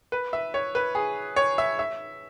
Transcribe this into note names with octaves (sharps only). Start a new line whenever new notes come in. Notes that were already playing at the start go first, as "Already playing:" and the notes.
B4
E5
C#5
B4
G#4
C#5
E5
E5